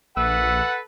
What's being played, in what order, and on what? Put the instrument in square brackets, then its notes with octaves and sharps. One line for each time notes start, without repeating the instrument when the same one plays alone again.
[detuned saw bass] A#1 [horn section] A4 B4 [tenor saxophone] E5 [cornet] F#5